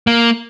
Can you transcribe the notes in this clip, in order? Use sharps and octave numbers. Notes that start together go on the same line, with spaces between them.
A#3